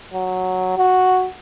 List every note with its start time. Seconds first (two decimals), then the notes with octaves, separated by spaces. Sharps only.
0.14 F#3
0.77 F#4